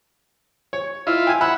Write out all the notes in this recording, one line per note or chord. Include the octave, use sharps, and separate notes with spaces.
C#5
E4 F4 D#5
G5 G#5
E5 F#5 B5